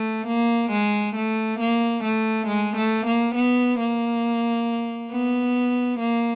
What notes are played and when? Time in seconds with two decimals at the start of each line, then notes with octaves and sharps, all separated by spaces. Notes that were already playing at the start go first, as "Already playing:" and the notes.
Already playing: A3
0.28 A#3
0.72 G#3
1.16 A3
1.60 A#3
2.04 A3
2.48 G#3
2.77 A3
3.06 A#3
3.36 B3
3.79 A#3
5.11 B3
5.99 A#3